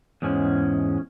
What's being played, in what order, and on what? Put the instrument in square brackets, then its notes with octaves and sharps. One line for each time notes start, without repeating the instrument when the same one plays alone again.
[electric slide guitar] E2 G#2 G#3 C#4